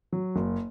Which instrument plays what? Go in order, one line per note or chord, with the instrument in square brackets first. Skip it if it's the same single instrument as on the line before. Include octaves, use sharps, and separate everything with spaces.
[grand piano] F#3
F#1